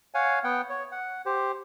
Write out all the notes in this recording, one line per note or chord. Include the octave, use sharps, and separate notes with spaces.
C#5 F5 F#5 G#5
B3 F#5 G5
C#5
F#5
G4 C5